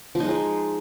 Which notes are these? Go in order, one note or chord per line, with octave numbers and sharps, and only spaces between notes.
F3
D#4
G#3
F3